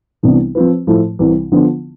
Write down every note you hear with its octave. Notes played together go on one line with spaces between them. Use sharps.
C2 C3 E3 B3 D4
F3 C4 F4 B4
A2 F3 A3 E4
C2 C3 E3
D3 F3 B3 D4 F4